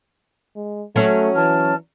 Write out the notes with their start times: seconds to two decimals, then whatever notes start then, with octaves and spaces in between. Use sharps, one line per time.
0.56 G#3
0.96 F#3 A3 C#4 C#5
1.35 E3 A5 F6